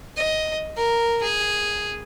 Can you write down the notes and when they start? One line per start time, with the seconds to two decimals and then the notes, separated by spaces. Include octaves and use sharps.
0.17 D#5
0.77 A#4
1.22 G#4